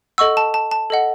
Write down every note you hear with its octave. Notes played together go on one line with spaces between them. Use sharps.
A4 D#5 F#5 C#6 E6
A5
A5
A5
A4 D#5 F#5